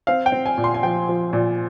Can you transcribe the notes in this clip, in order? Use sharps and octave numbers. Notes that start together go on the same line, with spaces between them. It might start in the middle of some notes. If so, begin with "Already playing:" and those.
C4 F5
G5
C4
G#5
A#2
C6
G#5
F3 G5
F3
A#2